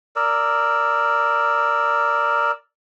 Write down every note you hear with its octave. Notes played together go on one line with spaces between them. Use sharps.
A#4 D5 E6